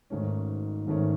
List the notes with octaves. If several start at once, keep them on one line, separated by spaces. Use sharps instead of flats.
G#1 G#2 D#3 A3 C#4
G#1 G#2 D#3 A3 C#4